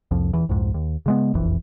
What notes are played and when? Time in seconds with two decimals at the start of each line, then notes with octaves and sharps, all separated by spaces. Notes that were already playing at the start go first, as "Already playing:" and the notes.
0.11 C2 F2 F3
0.33 D#1 E2 E3
0.49 C2 F2 G#2
0.74 D#2
1.06 C#3 G#3 B3
1.34 E1 A#1 F2 E3